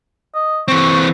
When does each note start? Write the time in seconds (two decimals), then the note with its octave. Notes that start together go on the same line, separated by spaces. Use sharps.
0.35 D#5
0.68 E3 C4 C#6